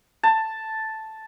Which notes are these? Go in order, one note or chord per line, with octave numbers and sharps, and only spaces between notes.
A5